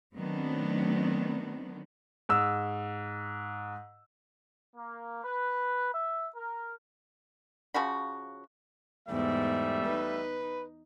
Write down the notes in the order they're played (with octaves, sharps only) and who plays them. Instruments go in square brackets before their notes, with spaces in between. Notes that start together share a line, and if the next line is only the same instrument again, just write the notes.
[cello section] D#3 F#3 A3 B3 C4 D4
[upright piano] G#2 E6
[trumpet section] A#3
B4
E5
A#4
[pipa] C#3 F3 F#4 B5
[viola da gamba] E2 G#2 [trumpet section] G3 A3 E5
[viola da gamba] D#4 [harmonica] B4